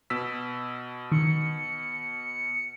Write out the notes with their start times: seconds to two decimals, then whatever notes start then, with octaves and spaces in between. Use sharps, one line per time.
0.10 B2 E6 B6
1.12 D#3 C#7